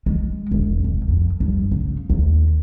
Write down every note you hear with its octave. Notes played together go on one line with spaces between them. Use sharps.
G#3
E1
C2
F2
G2
C#3
D#2